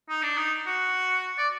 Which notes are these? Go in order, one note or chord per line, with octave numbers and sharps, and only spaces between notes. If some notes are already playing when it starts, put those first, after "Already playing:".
D#4
D4
D#4
F#4
D5